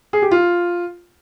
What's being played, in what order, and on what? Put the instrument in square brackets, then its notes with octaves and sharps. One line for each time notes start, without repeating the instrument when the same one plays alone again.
[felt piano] G#4
G4
F4